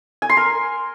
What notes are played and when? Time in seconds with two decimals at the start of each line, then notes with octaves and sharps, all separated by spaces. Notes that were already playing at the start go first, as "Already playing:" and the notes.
0.22 G#5
0.29 C6
0.37 A#4